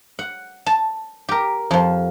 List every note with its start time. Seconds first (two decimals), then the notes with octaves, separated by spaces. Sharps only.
0.19 F#5
0.66 A5
1.29 G4 A#4
1.71 F2 F3